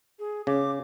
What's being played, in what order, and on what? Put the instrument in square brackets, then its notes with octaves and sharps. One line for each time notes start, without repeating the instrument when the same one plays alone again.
[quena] G#4
[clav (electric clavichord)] C#3 [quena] D6